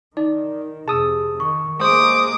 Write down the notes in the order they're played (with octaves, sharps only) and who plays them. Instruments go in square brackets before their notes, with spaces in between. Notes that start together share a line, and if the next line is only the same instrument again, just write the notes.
[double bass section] D#3 [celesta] D#4 [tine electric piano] D5
[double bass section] F2 C3 [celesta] G#4 [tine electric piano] A5 D#6 E6
[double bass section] D#3 [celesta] C#6
[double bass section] G#3 A#3 [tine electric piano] C5 [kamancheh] D6 D#6